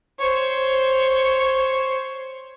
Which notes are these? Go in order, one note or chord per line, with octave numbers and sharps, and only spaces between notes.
C5 C#5